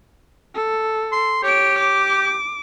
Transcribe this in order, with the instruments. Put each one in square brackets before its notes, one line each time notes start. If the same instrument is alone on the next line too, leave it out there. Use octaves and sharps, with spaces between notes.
[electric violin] A4
[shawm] C6
[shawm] G4 [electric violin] C#5 D7
[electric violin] D6